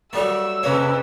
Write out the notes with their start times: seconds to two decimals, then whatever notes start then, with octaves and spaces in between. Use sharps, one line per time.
0.13 F#3 G3 A3 A#3 E6
0.63 F2 C3 A#3 B4 C#5